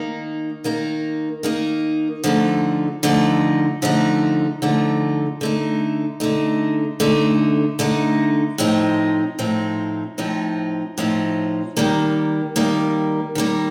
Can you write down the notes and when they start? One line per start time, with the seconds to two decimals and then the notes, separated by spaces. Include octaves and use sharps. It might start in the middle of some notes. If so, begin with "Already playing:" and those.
Already playing: D#3 A#3 D#4
0.64 D#3 A#3 D#4
1.43 D#3 A#3 D#4
2.24 D3 F3 A3 D#4
3.03 D3 F3 A3 D#4
3.82 D3 F3 A3 D#4
4.62 D3 F3 A3 D#4
5.41 D3 A3 D#4
6.20 D3 A3 D#4
7.00 D3 A3 D#4
7.79 D3 A3 D#4
8.58 A2 F3 C4 D#4
9.39 A2 F3 C4 D#4
10.18 A2 F3 C4 D#4
10.98 A2 F3 C4 D#4
11.77 D#3 G3 A#3
12.56 D#3 G3 A#3
13.35 D#3 G3 A#3